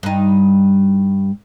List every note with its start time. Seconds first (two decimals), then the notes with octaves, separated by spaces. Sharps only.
0.03 G2 D#4